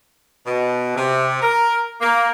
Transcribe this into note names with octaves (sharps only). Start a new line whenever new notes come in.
B2
C3
A#4
A#3